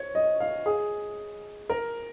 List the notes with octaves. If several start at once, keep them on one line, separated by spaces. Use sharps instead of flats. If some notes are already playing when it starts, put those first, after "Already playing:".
Already playing: C#5
D#5
F5
G#4
A#4